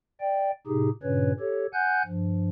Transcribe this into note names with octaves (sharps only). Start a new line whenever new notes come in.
D5 G5
A2 C3 D#4 G4 G#4
G2 A#2 C#3 C#4 B4 C#5
G4 A4 C#5
F#5 G#5 F#6 G6
G2 F3